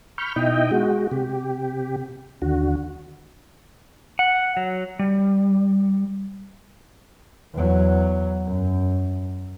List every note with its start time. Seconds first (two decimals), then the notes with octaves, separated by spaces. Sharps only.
0.18 B5 C#6 F6 G6
0.36 B2 D#4 E4 D#5 G5
0.71 G#3 F#4
1.11 C3 G4
2.42 D#2 D3 F#4
4.19 F#5
4.57 F#3
4.99 G3
7.54 E2 F#3
8.46 F#2